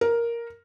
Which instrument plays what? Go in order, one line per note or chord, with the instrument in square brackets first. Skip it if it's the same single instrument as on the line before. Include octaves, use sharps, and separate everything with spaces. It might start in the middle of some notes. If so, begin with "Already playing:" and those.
[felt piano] A#4